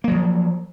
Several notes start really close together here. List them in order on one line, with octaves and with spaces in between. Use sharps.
A#3 F#3 F3